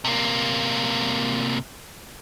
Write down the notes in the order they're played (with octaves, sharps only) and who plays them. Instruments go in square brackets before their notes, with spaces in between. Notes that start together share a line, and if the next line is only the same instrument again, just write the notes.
[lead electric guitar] C3 A#3